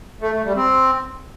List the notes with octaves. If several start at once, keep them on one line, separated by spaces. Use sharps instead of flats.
A3
A3
G3
C4